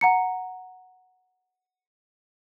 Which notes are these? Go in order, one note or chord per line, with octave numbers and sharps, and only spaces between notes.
F#5 A#5 C#7